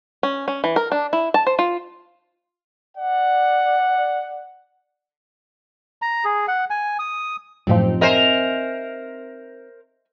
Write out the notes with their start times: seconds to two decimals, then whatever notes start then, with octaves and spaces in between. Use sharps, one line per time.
0.23 C#4
0.48 C#4
0.64 E3
0.76 A#4
0.92 D4
1.13 E4
1.34 A5
1.47 C5
1.59 F4
2.98 D5 F#5
6.02 A#5
6.25 G#4
6.48 F#5
6.70 G#5
6.99 D#6
7.67 F#2 A2 F3 C4 D#4 G4
8.01 A#4 C5 D#5 E5 G#5